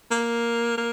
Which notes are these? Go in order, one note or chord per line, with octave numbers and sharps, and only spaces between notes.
A#3
A#3